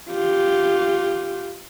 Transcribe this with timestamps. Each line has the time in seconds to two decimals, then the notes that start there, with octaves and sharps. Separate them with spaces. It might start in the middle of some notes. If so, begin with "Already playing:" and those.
0.10 F4 G4